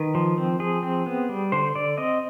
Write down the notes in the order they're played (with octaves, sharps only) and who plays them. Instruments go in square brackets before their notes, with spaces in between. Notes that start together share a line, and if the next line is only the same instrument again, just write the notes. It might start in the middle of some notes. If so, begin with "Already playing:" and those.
Already playing: [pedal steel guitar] D#3 B4
F3
C4
F3 G#4
C4
B3
G3
D3 C5
D3 D5
C4 D#5